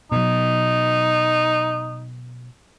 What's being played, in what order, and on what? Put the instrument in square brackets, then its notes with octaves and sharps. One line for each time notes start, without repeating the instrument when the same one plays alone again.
[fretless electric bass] B2 F#3 [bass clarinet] D#4